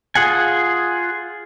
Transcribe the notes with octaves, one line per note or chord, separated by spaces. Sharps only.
F4 G#4 F#5 G#5